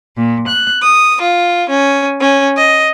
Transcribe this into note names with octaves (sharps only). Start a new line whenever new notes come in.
A#2
F#6
D#6
F4
C#4
C#4
D#5